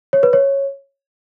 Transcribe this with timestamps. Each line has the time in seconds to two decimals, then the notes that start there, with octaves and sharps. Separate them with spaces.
0.13 C#5
0.23 B4
0.33 C#5